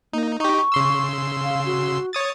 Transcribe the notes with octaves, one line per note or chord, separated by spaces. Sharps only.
A#3 D#4
D#4 G4 C#6
C#3 C6 E6
F5
F#4
C#5 D#6 A6